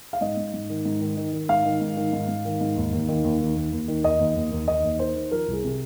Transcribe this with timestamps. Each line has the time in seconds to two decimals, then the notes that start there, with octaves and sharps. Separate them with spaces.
0.13 F5
0.21 G#2 D#5
0.37 G#2
0.54 G#2
0.69 D#3
0.85 G#2
1.01 D#3
1.17 D#3
1.33 D#3
1.49 G#2 F5
1.65 D#3
1.81 G#2
1.97 D#3
2.13 G#2
2.28 G#2
2.45 D#3
2.61 G#2
2.76 D#2
2.93 D#2
3.08 D#3
3.24 D#2
3.40 D#3
3.56 D#2
3.72 D#2
3.88 D#3
4.03 D#2 D#5
4.20 D#2
4.36 D#2
4.51 D#2
4.68 D#2 D#5
4.84 D#2
4.99 D#3 C5
5.15 D#3
5.31 F3 A#4
5.47 C2
5.53 G#4
5.64 C3